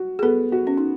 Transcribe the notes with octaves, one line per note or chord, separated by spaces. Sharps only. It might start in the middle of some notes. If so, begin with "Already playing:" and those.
Already playing: F#4
G#4
B3 A4
F#4
C#4
D#4